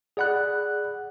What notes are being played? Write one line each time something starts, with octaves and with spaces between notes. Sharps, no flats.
G#4 D5 F#5 B5 F#6